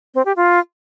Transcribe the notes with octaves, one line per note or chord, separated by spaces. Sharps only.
C4
G4
F4